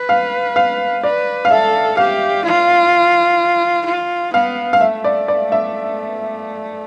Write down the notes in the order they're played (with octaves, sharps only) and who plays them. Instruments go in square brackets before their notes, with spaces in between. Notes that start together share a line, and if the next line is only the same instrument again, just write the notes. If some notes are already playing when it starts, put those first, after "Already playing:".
Already playing: [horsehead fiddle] B4
[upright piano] F5
F5
[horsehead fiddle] B4 [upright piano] D5
[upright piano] F5
[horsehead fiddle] A4 [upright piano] E5
[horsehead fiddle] G4 [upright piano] F5
[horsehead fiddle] F4
F4
[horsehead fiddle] B3 [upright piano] F5
[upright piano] F5
[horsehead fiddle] A3 [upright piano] E5
[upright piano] D5
D5
E5